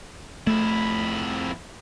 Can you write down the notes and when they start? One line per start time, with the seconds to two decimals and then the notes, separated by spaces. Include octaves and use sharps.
0.47 F2 A3 E4